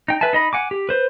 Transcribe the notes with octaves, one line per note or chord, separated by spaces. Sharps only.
D#4 G5
B4 E5 G#5 A5
D#4 D#5 B5
F#5 G#5 D6
G4
B4 C5